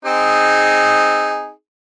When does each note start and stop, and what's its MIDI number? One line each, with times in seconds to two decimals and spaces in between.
0.05 1.51 60
0.05 1.51 63
0.05 1.51 68